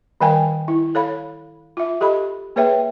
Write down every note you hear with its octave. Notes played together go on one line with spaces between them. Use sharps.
D#3 G3 A#4 F5 G5 G#5
E4
A4 C#5 F5 B5
F4 E5
G4 A4 D#5 B5
A#3 G#4 B4 C#5 E5 G5